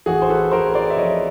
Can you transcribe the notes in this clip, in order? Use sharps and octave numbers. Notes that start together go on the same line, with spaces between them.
A1 F#4 G#4
C5
A4 B4
A1 A#4 C5
C5 D5
E5
F3 C#5 D#5